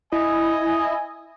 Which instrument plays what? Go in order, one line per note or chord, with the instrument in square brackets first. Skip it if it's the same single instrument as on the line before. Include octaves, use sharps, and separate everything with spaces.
[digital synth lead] E4 [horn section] D#5 G#5